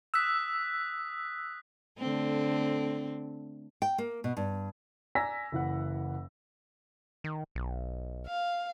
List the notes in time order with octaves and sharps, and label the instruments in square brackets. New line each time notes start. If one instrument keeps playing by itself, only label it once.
[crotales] D#6 F#6 B6 [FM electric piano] E6
[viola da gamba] D3 A3 C4
[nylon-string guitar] G5
A#3
B2
G2
[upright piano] D5 G#5 A#5 E6 A#6 B6
F#1 E3 F#5
[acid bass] D#3
B1
[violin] F5